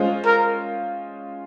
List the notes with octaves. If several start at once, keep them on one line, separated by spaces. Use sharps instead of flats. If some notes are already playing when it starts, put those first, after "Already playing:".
Already playing: G#3 C#4 F4 C5
A#4